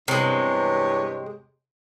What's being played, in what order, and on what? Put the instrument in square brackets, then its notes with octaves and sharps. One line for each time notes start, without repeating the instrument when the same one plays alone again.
[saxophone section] E2 G2 C#5 [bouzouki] C3 G#3